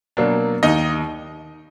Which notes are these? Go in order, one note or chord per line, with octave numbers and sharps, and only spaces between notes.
B2 F#3 A#3 D4
D#2 D#4 D#5